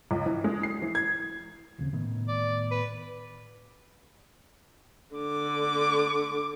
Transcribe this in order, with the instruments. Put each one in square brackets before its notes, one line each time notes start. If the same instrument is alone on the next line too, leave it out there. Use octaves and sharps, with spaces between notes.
[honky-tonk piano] C#2
E3
G#3
C7
E3
G#6
[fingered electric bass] D#1 C#3 C4
A2 D#3 B3
[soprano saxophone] D5
B4
[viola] D3 D6